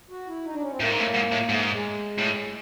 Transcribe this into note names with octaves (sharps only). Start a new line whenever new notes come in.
F#4
E4
D#4
D4
C#4
C4
A2 A#3
G#2
A2
G#2
A2
G#2 A3
G#3
A2
G#3